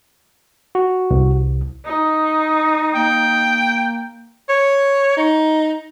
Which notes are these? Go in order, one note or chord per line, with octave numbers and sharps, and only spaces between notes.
F#4
C2
D#4
A#3 G5
C#5
D#4